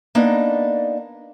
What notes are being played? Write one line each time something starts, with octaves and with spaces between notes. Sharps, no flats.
A#3 B3 D4 D#4 D5 D#5